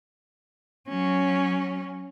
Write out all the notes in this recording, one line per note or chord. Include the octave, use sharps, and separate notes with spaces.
F#3 C#4